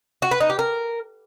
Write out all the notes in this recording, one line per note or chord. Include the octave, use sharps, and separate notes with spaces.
F#4
B4
D#4
G4
A#4